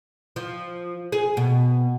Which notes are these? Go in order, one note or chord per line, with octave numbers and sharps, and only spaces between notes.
F3
G#4
B2